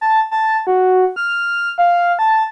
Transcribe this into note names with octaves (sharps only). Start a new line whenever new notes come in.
A5
A5
F#4
F6
F5
A5